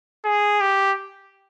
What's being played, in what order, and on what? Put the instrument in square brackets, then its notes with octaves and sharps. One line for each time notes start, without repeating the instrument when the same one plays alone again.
[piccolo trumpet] G#4
G4